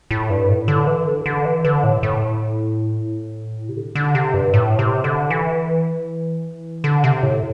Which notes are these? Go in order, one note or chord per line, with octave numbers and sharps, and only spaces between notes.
A2
G2
A2
D3
E3
D3
D3
E3
D3
A2
A2
C3
D3
D3
C3
G2
A2
C3
D3
E3
D3
C3
A2